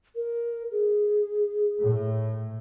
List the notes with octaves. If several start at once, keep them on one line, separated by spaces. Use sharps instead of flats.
A#4
G#4
A2